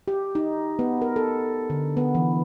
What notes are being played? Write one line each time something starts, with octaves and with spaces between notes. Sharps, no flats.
G4
D#4
B3
A#4
A4
D3
B3
E3